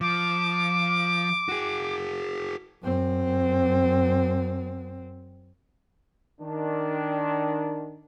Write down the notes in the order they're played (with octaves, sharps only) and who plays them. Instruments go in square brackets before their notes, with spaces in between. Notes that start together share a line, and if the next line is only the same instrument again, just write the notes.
[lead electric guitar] F3 [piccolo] D6
[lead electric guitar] F#4 G#4
[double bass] F#2 C4
[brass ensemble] D#3 D4